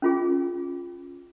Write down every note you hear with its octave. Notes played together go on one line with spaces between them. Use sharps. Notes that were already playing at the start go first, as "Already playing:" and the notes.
C#4 F4 G#4